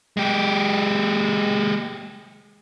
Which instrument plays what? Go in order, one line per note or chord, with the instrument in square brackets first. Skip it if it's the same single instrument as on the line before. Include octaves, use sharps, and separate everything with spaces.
[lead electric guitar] G#3 G4